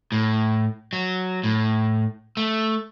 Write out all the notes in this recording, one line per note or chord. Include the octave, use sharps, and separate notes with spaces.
A2
F#3
A2
A3